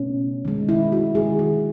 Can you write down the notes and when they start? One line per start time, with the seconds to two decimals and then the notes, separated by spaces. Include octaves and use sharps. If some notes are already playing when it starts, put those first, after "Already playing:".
Already playing: B2 A3 C#4
0.45 D#3 G#3
0.69 E4
0.92 F#4
1.15 D#3 G#3 G#4
1.39 F#4